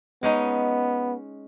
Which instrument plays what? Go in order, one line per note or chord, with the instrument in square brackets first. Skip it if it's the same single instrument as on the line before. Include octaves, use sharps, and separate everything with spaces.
[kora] G#3 C#4 D#4 [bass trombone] B3